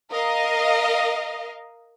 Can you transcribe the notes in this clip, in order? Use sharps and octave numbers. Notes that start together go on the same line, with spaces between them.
A#4 D#5 F5